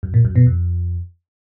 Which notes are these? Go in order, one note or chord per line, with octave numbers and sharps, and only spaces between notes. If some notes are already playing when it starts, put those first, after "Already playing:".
F#2
A#2
F#2
B2
F2